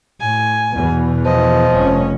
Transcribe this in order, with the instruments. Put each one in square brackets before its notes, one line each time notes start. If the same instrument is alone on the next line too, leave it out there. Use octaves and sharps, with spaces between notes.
[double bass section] A2 [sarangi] G#5
[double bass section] E2 B2 E3
[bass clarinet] F3 [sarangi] D#5
[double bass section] F1 G2 C#4